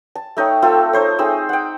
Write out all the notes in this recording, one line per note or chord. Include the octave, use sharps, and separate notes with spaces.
A5
A3 D#4 C#5 G5
A3 C4 F4 A4
D#4 C5 C#5
C4 D#4 G#4 E6
F#5 G5